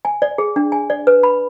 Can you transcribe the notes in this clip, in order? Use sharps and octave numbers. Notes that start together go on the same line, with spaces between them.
G#5
D5
G#4
D4
G#5
D5
B4
B5